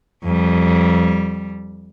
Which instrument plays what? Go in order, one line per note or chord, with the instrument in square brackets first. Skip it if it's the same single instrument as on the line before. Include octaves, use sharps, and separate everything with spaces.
[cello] F2 G3